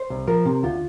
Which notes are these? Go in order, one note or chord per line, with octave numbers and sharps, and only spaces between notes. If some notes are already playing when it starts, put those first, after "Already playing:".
Already playing: C5
C2
F3 A#4
C3
D2 F4